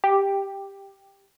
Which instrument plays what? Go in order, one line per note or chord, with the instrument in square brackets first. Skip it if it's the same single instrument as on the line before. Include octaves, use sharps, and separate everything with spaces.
[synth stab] G4